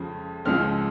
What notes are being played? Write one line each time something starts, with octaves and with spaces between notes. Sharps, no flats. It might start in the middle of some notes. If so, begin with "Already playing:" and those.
Already playing: F2 C#3 F3 G#3
C#2 C#3 F3 G#3 C4 F6